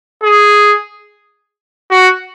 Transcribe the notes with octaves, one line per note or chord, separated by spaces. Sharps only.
G#4
F#4